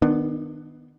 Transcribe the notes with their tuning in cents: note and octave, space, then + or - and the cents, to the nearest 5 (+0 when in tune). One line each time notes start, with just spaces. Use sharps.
D#3 +0 B3 +0 D4 +30